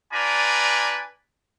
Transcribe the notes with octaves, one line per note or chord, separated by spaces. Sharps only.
D4 F4 B4 D5 G#5 A#5